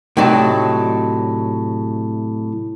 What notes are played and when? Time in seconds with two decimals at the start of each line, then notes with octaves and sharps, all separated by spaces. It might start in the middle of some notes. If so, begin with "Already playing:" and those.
0.17 A2 C3 F#3 D#4 D5 A5